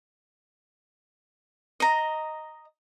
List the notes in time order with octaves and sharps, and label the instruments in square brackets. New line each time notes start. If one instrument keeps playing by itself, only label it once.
[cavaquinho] D#5 A#5